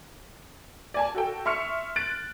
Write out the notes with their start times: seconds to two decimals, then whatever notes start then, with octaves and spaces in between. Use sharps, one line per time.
0.94 D5 G#5 A5
1.15 F#4 A4 G5
1.45 E5 C6 C#6 F6 C#7
1.96 F#6 A6 D7